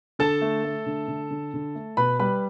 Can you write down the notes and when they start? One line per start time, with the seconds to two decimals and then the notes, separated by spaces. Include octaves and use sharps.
0.19 D3 A4 A5
0.41 A3
0.64 A3
0.86 D3
1.08 D3
1.31 D3
1.54 D3
1.75 A3
1.97 B2 B4 B5
2.19 G3 B4 B5